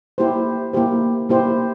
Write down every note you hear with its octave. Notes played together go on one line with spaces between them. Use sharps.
A#3 E4 G4 C5
A#3 E4 G4 C5
A#3 E4 G4 C5